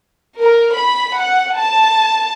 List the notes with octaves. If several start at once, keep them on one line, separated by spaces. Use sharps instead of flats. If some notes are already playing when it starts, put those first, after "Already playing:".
A#4
B5
F#5
A5